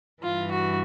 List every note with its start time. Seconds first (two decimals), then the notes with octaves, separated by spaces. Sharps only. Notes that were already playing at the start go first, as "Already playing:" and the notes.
0.22 G2 E3 F4
0.50 F#4